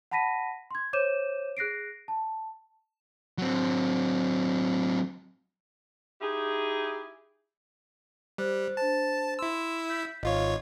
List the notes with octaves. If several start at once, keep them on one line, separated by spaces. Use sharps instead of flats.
F#5 A5 B5 A#6 B6 D#7
C6 G#6
C5 C#5 D6 G6 D#7 E7
G#4 F#6 A#6 C7 D7
A5
F#3 C4
D#4 E4 G4 G#4
G3 C5 F#6
D4 C5 A5
E4 C6 E6
G6 B6
G#1 F4 C#5 D#5 F5